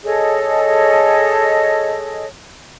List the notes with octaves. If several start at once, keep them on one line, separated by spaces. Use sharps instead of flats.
G#4 A4 C#5 D#5